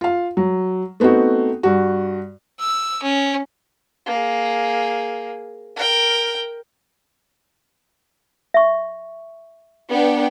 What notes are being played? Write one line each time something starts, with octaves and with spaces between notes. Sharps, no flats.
F4 F5
F#3
A3 B3 C4 D#4 F#4
G2 F#4
E6
C#4
A#3 G#4
A#4 G5
E5 C#6
B3 D4 G5